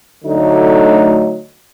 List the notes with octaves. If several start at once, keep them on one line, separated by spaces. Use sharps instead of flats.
D2 D3 F#3 A3 D#4